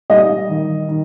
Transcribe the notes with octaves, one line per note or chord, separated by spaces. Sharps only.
G3 D#5
D#3
D#3